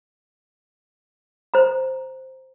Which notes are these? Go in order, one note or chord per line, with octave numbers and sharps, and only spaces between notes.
C5 A#5